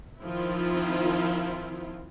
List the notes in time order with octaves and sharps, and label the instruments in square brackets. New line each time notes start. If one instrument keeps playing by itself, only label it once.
[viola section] D#3 F3 C4 E4 F4